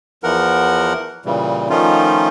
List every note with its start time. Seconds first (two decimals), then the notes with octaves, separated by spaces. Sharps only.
0.24 E2 E3 F3 A#4 F#5
1.25 A#2 C#3 E3 G3
1.70 D#3 F3 A3 C#4 D#4 F4